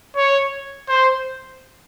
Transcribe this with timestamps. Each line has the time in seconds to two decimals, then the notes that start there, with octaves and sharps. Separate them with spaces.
0.17 C#5
0.89 C5